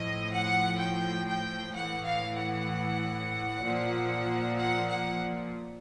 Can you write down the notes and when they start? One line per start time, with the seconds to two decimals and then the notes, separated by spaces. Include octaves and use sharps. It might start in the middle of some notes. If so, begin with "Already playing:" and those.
Already playing: A2 F3 D#5
0.32 F#5
0.78 G5
1.27 G5
1.73 A2 E3 F#5
2.04 F5
2.36 F#5
3.63 A#2 F3
4.56 F#5
4.88 F#5